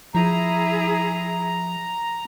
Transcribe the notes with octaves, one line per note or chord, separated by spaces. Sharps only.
F3 E4 G#4 A#5